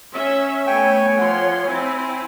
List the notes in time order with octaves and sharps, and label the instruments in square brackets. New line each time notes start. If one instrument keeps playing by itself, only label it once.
[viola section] C#4 E5
[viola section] A3 B3 [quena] C#5 [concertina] G5 G#5 C#6
[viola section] F3 C6 [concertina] F#5
[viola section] C4 E4 [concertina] G#5